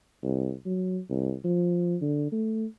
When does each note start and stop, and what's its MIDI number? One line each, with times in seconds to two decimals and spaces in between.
0.23 0.53 36
0.66 1.00 54
1.10 1.34 36
1.44 1.96 53
2.01 2.32 50
2.32 2.66 57